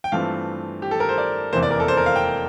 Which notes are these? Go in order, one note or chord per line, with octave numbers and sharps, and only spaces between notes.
G5
G2 E3 A3 C4 F4 F5
G4
A4
A#4
C5
D5
F1 E2 C3 E3 A#3 C5
D5
A#4
A4
C5
A#4
F5
G5